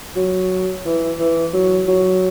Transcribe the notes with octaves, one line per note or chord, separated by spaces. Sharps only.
F#3
E3
E3
F#3
F#3